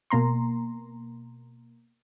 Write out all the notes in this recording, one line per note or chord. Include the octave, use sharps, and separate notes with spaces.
B2 A#3 A#5 C6